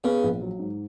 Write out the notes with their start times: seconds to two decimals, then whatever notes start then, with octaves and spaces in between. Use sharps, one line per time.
0.04 C#3 B3
0.23 A#1
0.42 F#3
0.59 G#2